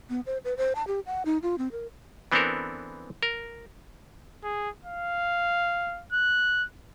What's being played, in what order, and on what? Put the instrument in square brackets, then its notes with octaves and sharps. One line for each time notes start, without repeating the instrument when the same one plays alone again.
[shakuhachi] B3
C5
B4
C5
A5
G4
F#5
D#4
F4
C4
A#4
[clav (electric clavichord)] E3 B3 C4 D4 A4 A#4
A#4
[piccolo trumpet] G#4
F5
F#6